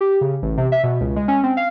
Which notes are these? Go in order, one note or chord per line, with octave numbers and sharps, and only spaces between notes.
G4
C#3
A1
C3
E5
B2
C#2
G#3
C#4
C4
F5